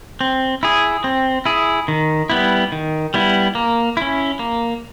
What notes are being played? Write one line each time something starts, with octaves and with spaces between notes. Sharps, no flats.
C4
E4 G#4
C4
E4 G#4
D#3
G3 B3 E4
D#3
G3 B3 E4
A#3
C#4 E4
A#3